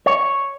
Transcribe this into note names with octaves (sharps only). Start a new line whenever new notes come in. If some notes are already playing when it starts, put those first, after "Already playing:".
C#5